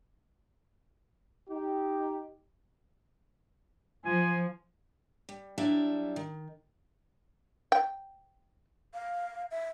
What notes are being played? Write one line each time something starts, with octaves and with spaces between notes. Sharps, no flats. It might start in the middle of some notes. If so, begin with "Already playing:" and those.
D#4 G4
F3 G#5
G3
F#3 G3 D4 E4 E5 F5
D#3
G5
F5
E5